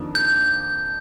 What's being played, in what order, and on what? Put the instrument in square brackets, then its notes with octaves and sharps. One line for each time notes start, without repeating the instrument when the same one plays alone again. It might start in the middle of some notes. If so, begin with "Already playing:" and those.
Already playing: [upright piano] F2 D#3 A#3 D4
[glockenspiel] G6